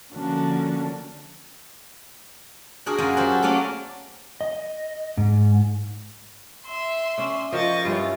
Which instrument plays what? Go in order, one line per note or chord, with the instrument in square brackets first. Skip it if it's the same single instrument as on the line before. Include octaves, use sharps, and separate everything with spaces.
[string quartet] D3 F3 A#3 C#4 D4 F#4
[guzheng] D4 F#4 G#4 A#4
F#2 D4 F4 G#5
F#3 F#4 G4 C5
A4
F#3 A3 A#3 C#4 D5 F5
[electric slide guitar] D#5
G#2
[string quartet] E5 C6
[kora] C#4 D4
[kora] F3 A#4 G5 [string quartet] D#5 C#6 A6
[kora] G2 E4 [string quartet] C#4 F4